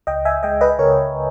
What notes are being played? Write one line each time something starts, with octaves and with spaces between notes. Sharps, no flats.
C#2 D#5 G5
E5 G#5
G#3 D#5 G5
B4 D#5
C#3 A#4 C#5